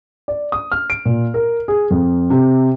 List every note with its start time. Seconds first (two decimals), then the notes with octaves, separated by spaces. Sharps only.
0.28 D5
0.52 D#6
0.72 F6
0.90 D7
1.05 A#2
1.34 A#4
1.68 G#4
1.91 F2
2.30 C3